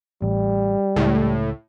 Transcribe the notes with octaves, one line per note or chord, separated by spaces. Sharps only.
A1 G3
C#2 A2